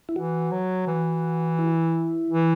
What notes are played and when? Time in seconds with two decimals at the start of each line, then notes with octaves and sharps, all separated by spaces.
0.09 E4
0.16 E3 F#4
0.51 F#3
0.87 E3
1.59 E4
2.30 E3